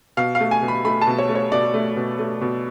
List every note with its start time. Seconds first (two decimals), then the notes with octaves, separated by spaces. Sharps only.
0.17 B2 F5
0.35 F5
0.40 A3
0.51 G#5
0.62 B2
0.68 B5
0.84 A3 B5
1.01 A5
1.07 B2
1.18 C#5
1.29 A3
1.35 C#5
1.52 B2 D5
1.74 A3
1.96 B2
2.19 A3
2.41 B2